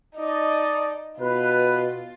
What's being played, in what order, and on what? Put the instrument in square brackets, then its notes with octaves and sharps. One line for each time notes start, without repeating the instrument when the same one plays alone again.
[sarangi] D#4 [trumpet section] D5 D#5 A5
[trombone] B2 [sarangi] F4 [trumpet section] B4